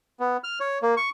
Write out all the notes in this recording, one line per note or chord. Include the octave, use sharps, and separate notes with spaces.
B3
F6
C#5
A#3
C#6